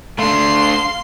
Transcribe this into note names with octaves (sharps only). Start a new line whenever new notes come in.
A3 D4 F5 C6